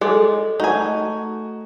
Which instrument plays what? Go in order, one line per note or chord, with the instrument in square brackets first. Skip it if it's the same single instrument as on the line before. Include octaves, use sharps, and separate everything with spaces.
[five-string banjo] G#3 [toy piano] G#4 A4
[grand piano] A3 F#4 [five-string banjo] D#4 G#5